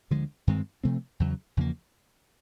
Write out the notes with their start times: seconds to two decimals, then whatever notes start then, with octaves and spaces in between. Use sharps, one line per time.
0.11 D2 D3 F3 G#3
0.47 G2 D#3 G#3 C4
0.84 C3 F3 A3 C4
1.20 E2 C#3 F#3
1.57 E2 C#3 F3 A#3